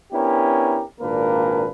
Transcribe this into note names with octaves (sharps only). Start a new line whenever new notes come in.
B3 C#4 D4 E4 G4 A#4
G#1 A#2 A#3 D4 A#4 B4